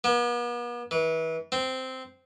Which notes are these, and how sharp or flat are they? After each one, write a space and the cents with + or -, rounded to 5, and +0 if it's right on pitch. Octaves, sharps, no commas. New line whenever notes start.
B3 -45
E3 -30
C4 -10